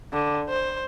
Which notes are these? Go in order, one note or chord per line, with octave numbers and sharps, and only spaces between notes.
D3
C5